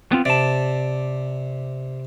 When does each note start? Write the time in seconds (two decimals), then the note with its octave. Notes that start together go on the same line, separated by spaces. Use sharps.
0.12 B3 C4 F4
0.25 C3 D5 A5